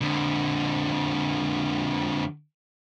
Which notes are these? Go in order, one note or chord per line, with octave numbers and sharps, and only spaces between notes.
F2 D3